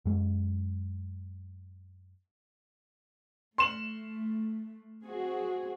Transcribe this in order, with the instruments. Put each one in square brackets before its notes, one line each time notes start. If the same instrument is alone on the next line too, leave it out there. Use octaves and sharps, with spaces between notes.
[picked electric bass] F#2 G#3
[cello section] A3 [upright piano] C6 E7 F#7
[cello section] C4 F#4 G#4